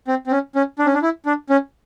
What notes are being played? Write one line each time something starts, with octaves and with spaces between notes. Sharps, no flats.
C4
C4
C#4
C#4
D4
C#4
D4
E4
D4
C#4